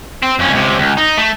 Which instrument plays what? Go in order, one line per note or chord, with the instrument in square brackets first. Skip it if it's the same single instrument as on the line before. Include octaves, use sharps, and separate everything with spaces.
[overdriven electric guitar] C4
F2 C#4
C#2 C3
C#2
D#4
A3